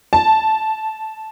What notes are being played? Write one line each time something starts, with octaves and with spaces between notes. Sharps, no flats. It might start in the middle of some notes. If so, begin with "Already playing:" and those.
A5